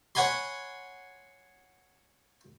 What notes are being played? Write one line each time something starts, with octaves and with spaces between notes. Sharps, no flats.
C#5 F#5 G#5 B5 C6